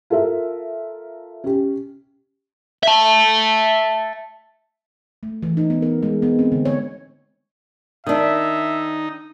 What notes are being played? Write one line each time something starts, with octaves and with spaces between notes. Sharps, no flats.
F4 A4 A#4 E5
C#4 G4
E5 A5
A3
E3
D#4
B3
A#4
G#3
B3
C4
D3
C#5
D#3 D4 D#4 E5